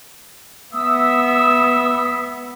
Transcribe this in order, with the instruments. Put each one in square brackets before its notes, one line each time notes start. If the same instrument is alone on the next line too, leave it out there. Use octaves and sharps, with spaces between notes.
[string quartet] B3 [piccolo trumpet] E5 [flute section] D#6 E6